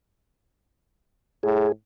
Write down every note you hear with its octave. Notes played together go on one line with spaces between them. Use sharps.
A2 G#4